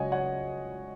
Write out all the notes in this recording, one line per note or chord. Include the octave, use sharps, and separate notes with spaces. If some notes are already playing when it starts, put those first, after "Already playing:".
Already playing: C#2 C#3 F#3 C#4 C#5 D#5 F#5 G#5
C#5 F#5